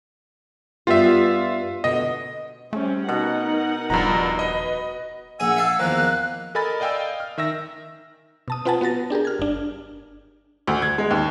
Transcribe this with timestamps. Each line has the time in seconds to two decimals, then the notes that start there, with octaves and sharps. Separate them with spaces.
0.87 G2 B3 F4 G4 E5
1.84 B2 D3 D#5
2.73 G3 A3 C4 C#4
3.09 B2 D#4 A#4 F#5
3.90 D#1 G2 F3 A#5
4.39 B4 D#5
5.40 A#1 G#4 F#5 G#5 D#6 E6
5.56 E5 F5 A5
5.79 E2 D#3 F3 A#3 F#6
6.55 A4 A#4 D#5 G#5 B5 A6
6.80 D5 D#5 F5 G5 G#5 E6
7.20 F6
7.38 D#3 E5 E6 A#6
8.48 B2 A5 D#6
8.65 C4 F4 B4 F#5 G#5 A5
8.81 B3 F#4 B4 A6 A#6
9.10 D4 G4 G#4 A#4
9.25 F6 G#6
9.39 G1 D4
10.67 D2
10.82 G#6
10.98 G#3
11.11 D#2